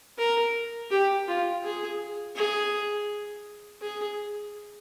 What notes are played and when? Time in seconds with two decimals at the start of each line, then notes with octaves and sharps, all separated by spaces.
0.18 A#4
0.91 G4
1.28 F4
1.63 G#4
2.36 G#4
3.81 G#4